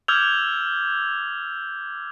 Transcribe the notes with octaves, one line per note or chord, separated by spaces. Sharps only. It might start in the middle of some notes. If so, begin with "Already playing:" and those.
D6 E6 F6 G6 G#6 F7